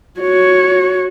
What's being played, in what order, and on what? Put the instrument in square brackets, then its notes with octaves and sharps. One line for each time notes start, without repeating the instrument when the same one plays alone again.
[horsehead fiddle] F#4 C#5